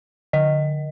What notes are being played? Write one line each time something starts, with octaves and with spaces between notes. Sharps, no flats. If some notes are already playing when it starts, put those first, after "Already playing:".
D3 D#5